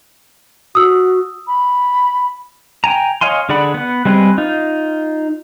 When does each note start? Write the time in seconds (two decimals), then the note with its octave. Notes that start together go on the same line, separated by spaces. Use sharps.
0.75 F#4 D#6 E6
1.47 B5
2.84 G5 G#5 A#5
3.21 C#5 D#5 F5 G#5 C6
3.49 D3 G#4 D5 F#5 B5
3.74 B3 F#5
4.05 G3 G#3 C4 G#4 B4
4.38 D#4 F4